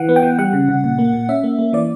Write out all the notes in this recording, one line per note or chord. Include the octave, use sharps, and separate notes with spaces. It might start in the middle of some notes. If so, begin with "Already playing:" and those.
Already playing: E3 F#5
B3
G5
E3
G3 F#5
C#3
C#3
A#2
A#3
A#2
C#4 E5
A#3
A#3
E3 D5